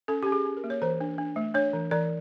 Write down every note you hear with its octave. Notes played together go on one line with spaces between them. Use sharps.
C#4 A4
C#4 G4
G#4
C#4
A#4
A#3
C#5
E3 C5
D4
D4
A3
D4 C#5
E3
E3 D5